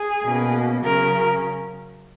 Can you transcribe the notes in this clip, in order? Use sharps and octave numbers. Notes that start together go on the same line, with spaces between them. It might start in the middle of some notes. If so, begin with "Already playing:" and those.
Already playing: G#4
B2 A#3 C#4
C#3 F#3 C#4 A#4